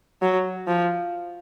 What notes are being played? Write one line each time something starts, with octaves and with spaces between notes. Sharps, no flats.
F#3
F3